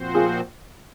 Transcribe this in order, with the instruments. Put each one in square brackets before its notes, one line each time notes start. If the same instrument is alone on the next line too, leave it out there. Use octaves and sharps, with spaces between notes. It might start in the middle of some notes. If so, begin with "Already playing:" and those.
Already playing: [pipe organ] A#2 F3 C4 F#4 C5
[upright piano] F4 G#4